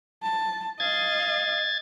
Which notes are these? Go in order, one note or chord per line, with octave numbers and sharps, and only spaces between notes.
A5
D#5 F5 G#6 A6